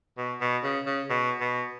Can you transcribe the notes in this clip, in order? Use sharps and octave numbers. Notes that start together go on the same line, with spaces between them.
B2
B2
C#3
C#3
B2
B2